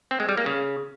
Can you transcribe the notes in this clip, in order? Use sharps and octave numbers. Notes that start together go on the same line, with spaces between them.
C4
G#3
G3
A#3
C#3